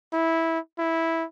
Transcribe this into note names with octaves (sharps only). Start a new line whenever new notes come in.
E4
E4